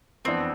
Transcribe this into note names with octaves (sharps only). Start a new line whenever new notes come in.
F2 E3 B3 C4 D4